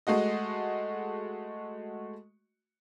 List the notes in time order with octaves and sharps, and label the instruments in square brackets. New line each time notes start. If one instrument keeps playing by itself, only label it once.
[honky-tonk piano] G#3 A3 F#4 D#5